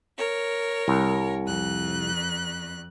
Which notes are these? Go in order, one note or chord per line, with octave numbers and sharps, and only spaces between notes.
A#4 C#5
C2
F2 F#6